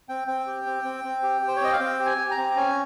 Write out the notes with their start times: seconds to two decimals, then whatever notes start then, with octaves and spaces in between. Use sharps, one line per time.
0.09 C4 G5
0.28 C4 G5
0.46 G4
0.66 C4
0.84 C4
1.04 C4
1.23 G4
1.42 G4
1.48 C5
1.56 C#5
1.61 C4 D#5
1.72 F5
1.80 C4 G5
1.99 G4
2.06 G#5
2.18 G4
2.31 A#5
2.38 C4
2.57 C#4 G#5